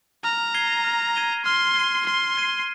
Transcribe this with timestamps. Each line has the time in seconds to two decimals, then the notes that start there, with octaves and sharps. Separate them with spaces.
0.24 A#5 F6
0.54 G#6 C7 D#7 G7
0.85 F6
1.16 G#6 C7 D#7 G7
1.45 C6 F6
1.76 G#6 C7 D#7 G7
2.06 C6 F6
2.37 G#6 C7 D#7 G7